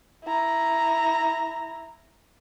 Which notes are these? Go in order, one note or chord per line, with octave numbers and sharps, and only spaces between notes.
E4 A#5